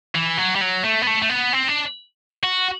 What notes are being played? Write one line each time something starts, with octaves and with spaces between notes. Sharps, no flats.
E3
F#3
G3
F#3
A3
B3
A3
A3
B3
C4
D4
F#4